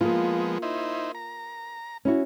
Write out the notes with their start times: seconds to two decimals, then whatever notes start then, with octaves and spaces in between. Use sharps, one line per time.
0.01 F3 G#3 A#3 B3 F4
0.62 D#4 E4 C5
1.15 A#5
2.05 C#4 E4 F#4